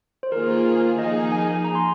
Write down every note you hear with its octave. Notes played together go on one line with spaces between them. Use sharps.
C5
D#3 A#3 F4 G#4 A#4
F3 A#3 D#4 G#4 D#5
G#5
A#5
C6